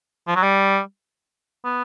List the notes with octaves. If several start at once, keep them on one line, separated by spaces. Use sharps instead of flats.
F3
F#3
G3
B3